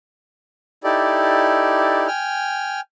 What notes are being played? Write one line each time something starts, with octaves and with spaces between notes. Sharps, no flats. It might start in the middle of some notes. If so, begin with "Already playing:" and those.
D#4 E4 G4 A4 D5
G5 G#5 F6